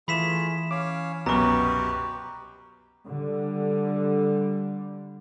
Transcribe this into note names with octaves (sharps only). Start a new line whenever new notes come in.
E3 A3 F4 G#4 B5 B6 E7
C#4 C#5 F5 D6
C2 F#2 B2 G4 B4 A#5 C#6
D3 G3